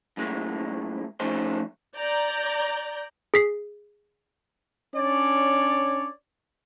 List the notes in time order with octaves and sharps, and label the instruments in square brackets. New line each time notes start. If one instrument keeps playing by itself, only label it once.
[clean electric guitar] F#2 A2 G#3 A#3
F3 A3 C#4 D#4 G#4 C5
[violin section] D5 A#5 G6
[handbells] G#4 B6 C7
[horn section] C#4 D4 C#5 D5